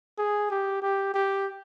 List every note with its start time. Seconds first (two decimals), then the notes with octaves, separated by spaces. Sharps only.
0.19 G#4
0.51 G4
0.83 G4
1.14 G4